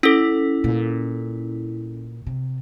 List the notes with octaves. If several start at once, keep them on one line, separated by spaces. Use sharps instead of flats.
C#4 E4 A4
A#2
C3